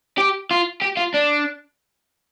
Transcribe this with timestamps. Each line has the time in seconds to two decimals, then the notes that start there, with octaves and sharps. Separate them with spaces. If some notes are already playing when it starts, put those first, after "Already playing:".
0.18 G4
0.51 F4
0.82 G4
0.97 F4
1.14 D4